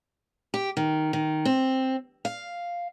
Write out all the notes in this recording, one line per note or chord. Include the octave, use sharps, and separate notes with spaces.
G4
D#3
D#3
C4
F5